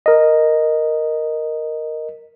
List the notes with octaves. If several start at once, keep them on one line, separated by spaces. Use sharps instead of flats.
A#4 D#5